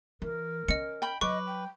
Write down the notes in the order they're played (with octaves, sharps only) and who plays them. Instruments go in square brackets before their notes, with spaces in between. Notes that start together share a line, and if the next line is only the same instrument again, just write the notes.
[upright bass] E3 [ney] A#4
[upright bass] C#4 [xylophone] D#5 C#7
[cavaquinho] G5 B5
[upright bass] F#3 [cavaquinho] B4 D6 [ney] D#5 [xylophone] C#6
[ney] G5